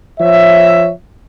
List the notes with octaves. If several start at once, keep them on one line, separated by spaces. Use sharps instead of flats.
F3 C#5 E5